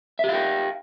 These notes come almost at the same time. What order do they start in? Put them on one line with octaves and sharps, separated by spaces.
E5 G4 F5 G5